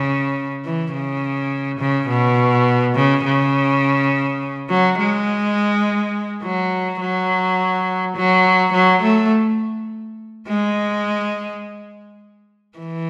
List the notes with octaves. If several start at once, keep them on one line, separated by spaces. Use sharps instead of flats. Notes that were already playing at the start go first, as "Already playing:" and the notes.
Already playing: C#3
E3
C#3
C#3
B2
C#3
C#3
F#3
G#3
F#3
F#3
F#3
F#3
A3
G#3
E3